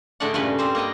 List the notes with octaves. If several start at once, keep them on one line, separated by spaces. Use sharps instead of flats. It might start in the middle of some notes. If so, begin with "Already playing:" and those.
A2 D3 G#3 A3 D5 F#5
G2 A#2 C#3 B4
G3 C4 C5
A#3 B3 D#5 G5